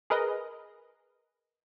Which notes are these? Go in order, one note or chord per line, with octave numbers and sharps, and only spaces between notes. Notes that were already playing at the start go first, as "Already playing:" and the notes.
G#4 A#4 B4 D#5